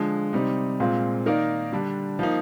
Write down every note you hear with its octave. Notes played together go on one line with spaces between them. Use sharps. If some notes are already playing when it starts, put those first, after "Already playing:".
Already playing: D3 F3 G#3
C3 G3 C4 D#4
A#2 G#3 C4 F4
D#3 A#3 D#4 A#4 D5
D3 G3 D4
F3 A#3 D#4